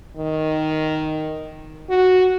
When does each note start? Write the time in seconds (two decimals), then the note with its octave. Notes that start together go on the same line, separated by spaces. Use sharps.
0.17 D#3
1.90 F#4